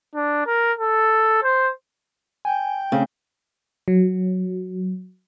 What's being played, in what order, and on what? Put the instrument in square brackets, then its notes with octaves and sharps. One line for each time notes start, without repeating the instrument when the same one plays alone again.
[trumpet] D4
A#4
A4
C5
[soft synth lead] G5 [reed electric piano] G#5
[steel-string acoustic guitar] C#3 [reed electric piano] A3 C4 C#4
[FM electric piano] F#3